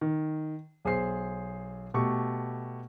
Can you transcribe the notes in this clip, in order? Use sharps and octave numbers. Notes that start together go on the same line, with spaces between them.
D#3
B1 G#4 C5 C7
B2 A3 G4 C#6